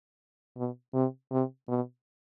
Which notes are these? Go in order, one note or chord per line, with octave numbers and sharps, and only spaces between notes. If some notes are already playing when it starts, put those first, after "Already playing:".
B2
C3
C3
B2